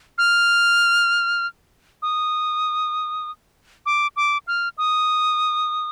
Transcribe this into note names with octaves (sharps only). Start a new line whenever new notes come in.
F6
D#6
D6
D6
F6
D#6